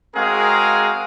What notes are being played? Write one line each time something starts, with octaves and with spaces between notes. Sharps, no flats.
G#3 C4 F#4 G#4 A#4 F5